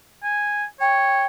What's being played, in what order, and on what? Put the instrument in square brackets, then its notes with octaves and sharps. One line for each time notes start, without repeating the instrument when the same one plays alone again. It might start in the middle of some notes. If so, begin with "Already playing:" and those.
[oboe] G#5
[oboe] C#5 [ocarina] G5